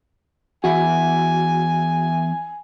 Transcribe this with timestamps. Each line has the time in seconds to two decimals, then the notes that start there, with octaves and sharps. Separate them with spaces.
0.64 E2 E4 F#4 G#5